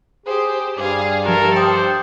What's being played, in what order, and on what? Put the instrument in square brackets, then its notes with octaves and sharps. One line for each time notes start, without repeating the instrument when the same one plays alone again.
[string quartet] G4 C5 [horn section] G#4
[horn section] G2 [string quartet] G#4 F5 [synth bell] D6
[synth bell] F3 G4 [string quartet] A4 [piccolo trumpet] A#4
[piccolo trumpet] C5 [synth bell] G5 D6 D#6